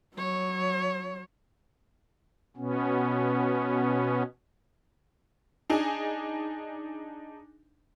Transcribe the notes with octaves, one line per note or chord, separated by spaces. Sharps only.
F#3 C#5
B2 B3 C#4
D4 D#4 G#4